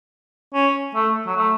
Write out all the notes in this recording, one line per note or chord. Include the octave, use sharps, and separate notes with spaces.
C#4
A3
F#3
A3